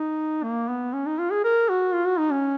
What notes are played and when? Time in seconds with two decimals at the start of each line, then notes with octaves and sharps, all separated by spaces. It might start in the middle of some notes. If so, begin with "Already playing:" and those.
Already playing: D#4
0.43 A#3
0.69 B3
0.93 C#4
1.06 D#4
1.19 F4
1.32 G#4
1.44 A#4
1.69 F#4
1.94 F4
2.07 F#4
2.19 D#4
2.32 C#4